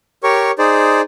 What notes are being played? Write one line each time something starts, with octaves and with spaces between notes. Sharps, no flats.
G4 A#4 C#5 C#6
D#4 G#4 C5 D5